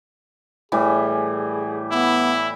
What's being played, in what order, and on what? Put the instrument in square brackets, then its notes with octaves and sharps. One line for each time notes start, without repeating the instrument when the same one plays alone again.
[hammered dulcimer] A2 E3 G3 [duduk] G#4
[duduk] B3 [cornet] E4